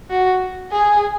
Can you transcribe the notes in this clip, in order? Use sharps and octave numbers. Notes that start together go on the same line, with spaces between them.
F#4
G#4